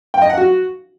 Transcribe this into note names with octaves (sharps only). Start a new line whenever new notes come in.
G5
D#5
F#5
F#4